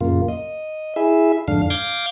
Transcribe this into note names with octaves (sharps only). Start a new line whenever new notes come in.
F#2 A#2 C#3 A#3 F4
D#5
E4 G#4 E5
F2 G#2 D3 D4 F5
F5 D6 G6 G#6 A#6